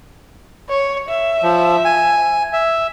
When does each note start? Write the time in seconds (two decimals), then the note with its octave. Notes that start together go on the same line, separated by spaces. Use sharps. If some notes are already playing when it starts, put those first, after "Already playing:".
0.69 C#5
1.09 E5
1.43 F3
1.85 G#5
2.53 E5